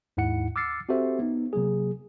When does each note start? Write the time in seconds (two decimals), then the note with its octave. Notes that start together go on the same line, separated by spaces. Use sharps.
0.17 D#2 G#2 E4 F#5 C#7
0.56 D6 E6 F6 A6 C7 C#7
0.89 C4 F#4 G4 A4 C5 E5
1.19 B3 D#4
1.53 C3 F#3 A#3 G#4